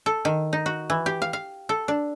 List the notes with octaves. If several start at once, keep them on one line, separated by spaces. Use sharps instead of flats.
A4
D#3
D#4
F#4
E3
G4
F5
F5
A4
D4